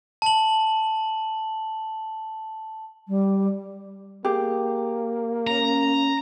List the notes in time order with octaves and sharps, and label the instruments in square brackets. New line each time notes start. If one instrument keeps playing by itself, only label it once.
[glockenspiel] A5 F#7
[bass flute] G3
[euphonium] A#3 [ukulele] G4 G#4
[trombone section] C#4 [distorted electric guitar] A#5